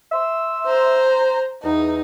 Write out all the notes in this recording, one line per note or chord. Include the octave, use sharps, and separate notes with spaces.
E5 C6 E6
C5 A#5
E2 D#4